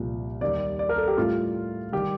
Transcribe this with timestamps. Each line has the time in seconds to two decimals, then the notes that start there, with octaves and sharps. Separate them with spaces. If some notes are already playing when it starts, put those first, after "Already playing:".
Already playing: C2 A#2 F3
0.41 D#2 D#3 G3 D5
0.79 D5
0.89 A#4
0.98 A4
1.08 G4
1.18 A2 G3 F4
1.92 D#3 G3 G4